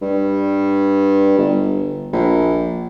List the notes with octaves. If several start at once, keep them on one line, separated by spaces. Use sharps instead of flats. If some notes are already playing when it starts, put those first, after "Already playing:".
G2
G1
A#1